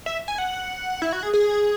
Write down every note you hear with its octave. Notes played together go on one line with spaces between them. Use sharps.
E5
G#5
F#5
E4
F#4
G#4
G#4